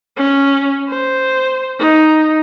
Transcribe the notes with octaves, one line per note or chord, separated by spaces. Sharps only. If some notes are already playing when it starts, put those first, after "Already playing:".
C#4
C5
D#4